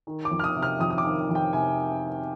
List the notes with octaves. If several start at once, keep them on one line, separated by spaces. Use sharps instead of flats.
D#3
D6
F2
F6
D#6
C3
F6
F2 D#6
D#6
D6
D#3
F2
G5
C3 G#5